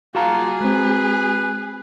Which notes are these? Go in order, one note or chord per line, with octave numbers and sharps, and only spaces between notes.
A#3 F4 F#4 G#4 A5 A#5
G#3 C4 B4